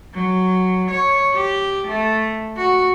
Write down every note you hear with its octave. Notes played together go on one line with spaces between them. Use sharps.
F#3
C#5
G4
A3
F#4